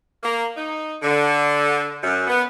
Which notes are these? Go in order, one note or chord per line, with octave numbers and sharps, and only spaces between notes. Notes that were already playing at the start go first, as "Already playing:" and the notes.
A#3
D#4
D3
F#2
B3